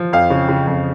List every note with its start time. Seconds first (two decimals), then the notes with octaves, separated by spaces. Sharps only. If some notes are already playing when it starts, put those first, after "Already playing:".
Already playing: F3
0.13 F2 F5
0.30 C#3
0.49 C#3
0.67 F2